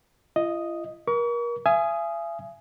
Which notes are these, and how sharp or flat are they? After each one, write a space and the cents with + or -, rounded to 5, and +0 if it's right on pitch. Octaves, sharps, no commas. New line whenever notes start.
F4 -45 D#5 +0
A#4 +30 C#6 +40
E5 +45 G#5 +10 D#6 +0